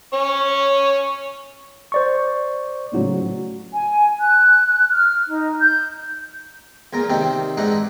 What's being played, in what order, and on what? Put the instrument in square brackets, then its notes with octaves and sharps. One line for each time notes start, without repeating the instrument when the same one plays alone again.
[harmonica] C#4 C#5
[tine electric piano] C5 D5 C#6
[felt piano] A2 C#3 F#3
[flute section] G#5
F#6
F6
D#4
G6
[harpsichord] E2 A#2 A#4
C3 D#3 C4 D4
G#2 E3 D4 D#4 F#5